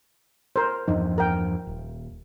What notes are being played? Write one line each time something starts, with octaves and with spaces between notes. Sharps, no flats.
A#4 C5
E2 G2 F3 D#4
A#4 G5
D#1